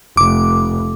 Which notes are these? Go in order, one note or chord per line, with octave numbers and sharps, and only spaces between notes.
F1 D6